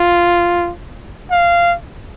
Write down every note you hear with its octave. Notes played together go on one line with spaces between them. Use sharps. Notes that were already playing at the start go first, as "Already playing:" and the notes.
Already playing: F4
F5